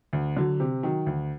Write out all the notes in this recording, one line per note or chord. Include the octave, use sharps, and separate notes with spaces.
D2
D3 F#3
C3
D#3 F#3
D2